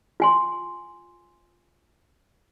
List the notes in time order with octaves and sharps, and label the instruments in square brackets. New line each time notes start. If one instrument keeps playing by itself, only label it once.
[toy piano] F4 G#5 C6